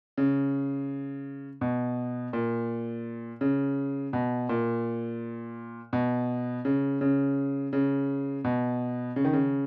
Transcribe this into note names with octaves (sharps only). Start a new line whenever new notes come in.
C#3
B2
A#2
C#3
B2
A#2
B2
C#3
C#3
C#3
B2
C#3
D#3
C#3